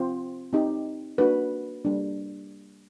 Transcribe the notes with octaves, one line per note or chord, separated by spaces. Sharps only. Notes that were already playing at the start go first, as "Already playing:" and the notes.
Already playing: C4 F4 C5
C4 D#4 G4
A#3 D4 F#4 B4
G3 A#3 D4